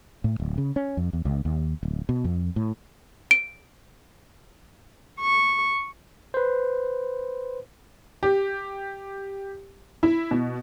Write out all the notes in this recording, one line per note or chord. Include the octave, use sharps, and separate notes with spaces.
A2
D1
C#3
C#4
F2
E2
C#2
D#2
D1
B2
F2
A2
D7
C#6
B4 C5
G4
E4
B2